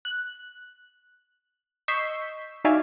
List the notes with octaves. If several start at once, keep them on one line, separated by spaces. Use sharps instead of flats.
F#6
D#5 C#6 E6 G6 B6 C7
D#4 F#4 D5 E5 F5 G#5